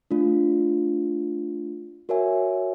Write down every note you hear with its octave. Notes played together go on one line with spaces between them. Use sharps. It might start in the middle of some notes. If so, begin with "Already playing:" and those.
A3 D4 F4
F#4 A#4 C#5 E5 G#5